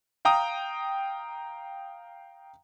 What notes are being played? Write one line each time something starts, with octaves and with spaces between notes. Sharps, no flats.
F5 G5 A#5 D#6